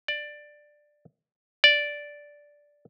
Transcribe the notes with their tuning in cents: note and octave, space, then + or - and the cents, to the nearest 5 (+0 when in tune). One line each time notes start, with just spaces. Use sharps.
D5 +10
D5 -5